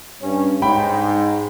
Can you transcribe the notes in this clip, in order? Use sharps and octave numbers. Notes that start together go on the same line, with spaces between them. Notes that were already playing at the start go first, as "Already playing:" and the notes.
G2 C#4
G#2 G5 B5